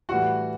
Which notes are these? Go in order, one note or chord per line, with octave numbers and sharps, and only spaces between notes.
A2 E3 G3 F#4 F#5